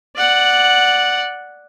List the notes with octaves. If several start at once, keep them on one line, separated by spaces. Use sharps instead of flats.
D5 F#5